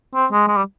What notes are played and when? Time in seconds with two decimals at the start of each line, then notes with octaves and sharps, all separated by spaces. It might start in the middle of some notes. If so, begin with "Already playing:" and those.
0.15 C4
0.32 G#3
0.48 G#3
0.56 G3